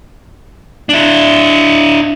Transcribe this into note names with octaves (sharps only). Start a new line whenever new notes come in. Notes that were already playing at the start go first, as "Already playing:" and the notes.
D4 E4